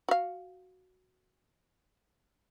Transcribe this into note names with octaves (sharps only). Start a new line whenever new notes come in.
F#4 F5